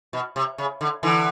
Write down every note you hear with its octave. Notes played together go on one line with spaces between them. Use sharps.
B2
C3
C#3
D3
D3 E3